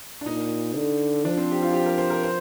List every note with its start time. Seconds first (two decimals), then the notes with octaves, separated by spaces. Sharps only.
0.21 D4
0.26 A#2 D#4
0.76 D3
1.25 F3 D4
1.37 C4
1.52 G4
1.62 F4
1.73 G4
1.86 A#4
1.98 C5
2.10 A#4
2.23 C5